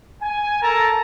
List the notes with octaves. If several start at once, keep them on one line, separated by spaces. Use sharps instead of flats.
G#5
A4 A#4 A5 A#5